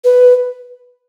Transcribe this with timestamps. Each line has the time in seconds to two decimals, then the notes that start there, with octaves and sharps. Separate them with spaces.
0.04 B4